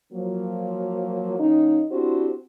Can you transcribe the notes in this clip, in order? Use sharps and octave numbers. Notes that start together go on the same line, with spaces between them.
F3 F#3 A#3
D#3 A#3 C#4 D#4
C4 D4 E4 F#4 G4 C5